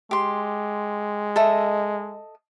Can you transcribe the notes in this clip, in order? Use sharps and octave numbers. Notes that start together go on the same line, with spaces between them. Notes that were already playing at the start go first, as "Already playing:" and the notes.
G#3 G4 C6
A4 D#5 E5